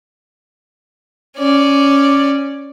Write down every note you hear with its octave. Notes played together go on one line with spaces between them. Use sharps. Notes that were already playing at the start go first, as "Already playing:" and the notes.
C#4 D5